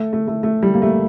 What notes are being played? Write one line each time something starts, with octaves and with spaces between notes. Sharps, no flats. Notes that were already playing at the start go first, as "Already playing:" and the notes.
Already playing: A3
A3
A3
A3
G3
A#3
A3